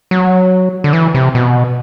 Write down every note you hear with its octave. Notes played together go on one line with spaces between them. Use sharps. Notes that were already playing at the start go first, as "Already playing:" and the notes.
F#3
D3
E3
C3
B2